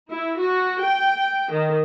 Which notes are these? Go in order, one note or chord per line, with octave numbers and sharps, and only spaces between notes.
E4
F#4
G5
D#3